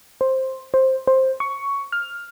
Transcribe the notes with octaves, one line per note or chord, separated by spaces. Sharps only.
C5
C5
C5
C#6
F6